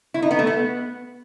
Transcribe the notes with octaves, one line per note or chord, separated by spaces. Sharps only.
E4
D#4
B3
A3
B3